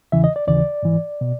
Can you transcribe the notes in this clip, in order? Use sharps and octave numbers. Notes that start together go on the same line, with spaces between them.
E2 C#3 E3 E5
D#5
D5
D#2 C#3 E3 D5
G#2 E3
B2